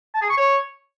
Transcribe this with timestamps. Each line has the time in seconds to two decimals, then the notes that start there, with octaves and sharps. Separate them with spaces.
0.14 A5
0.22 G#4
0.30 C#6
0.37 C#5